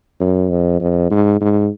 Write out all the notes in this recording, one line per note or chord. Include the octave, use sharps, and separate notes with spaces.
F#2
F2
F2
G#2
G#2